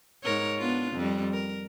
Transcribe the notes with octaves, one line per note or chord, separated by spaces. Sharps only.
G#2 A#4 C#5
B3 D4 F4
F2 G3
A#4